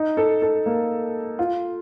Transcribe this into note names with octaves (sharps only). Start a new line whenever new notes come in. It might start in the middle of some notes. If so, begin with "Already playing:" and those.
Already playing: D#4
A4
A4
A#3
F4